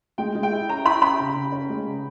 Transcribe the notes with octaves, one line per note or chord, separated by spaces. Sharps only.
G#3 G5
G#3
G5
E4
C#4 A#5
E4 B5
C#4 B5
C#3
C#3
C#4
G#3
C#3